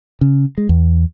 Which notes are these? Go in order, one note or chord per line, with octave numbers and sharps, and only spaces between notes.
C#3
G#3
E2